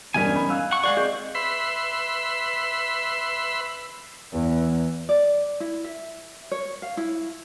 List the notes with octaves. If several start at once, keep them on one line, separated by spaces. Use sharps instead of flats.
E1 G2 C#4 D#4 G#5 B6
B5
F5 E6 F#6
F#5 C#6
G#3 D5 F5 F#5 C#6 C7
C4 G#4 D5 D#5 G6
B4 E5 B5 C6
E2
D5
E4
E5
C#5
F5
E4